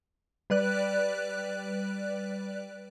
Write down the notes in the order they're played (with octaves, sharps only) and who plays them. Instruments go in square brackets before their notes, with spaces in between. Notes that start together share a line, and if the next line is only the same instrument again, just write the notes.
[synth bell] G3 B4 D5 F#6